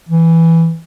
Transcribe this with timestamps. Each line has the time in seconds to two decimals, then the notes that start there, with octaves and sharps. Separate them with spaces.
0.09 E3